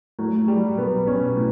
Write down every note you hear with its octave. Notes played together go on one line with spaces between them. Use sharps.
A2 F#3
F#3 G3
B1 B3
B1 C#4
A2